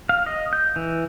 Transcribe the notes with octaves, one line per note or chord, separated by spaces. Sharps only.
F5
D#5
G6
E3